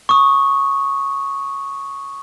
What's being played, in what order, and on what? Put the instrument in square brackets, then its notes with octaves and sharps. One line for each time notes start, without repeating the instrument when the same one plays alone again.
[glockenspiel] C#6 D#6